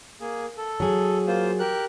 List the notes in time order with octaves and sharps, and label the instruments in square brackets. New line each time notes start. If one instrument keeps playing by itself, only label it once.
[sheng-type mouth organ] A#3 G#4
A4
[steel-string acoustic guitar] F#3 G#4
[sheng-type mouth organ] A#3 F4 C5
G4 A#4 F#6